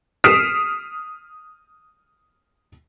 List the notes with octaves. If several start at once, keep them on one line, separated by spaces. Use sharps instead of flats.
D#6 F6 B6 C7 D7 E7